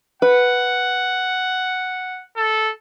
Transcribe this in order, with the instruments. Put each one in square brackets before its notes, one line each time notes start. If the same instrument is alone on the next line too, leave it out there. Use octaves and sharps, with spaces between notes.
[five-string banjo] B4 [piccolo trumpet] F#5
[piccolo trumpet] A4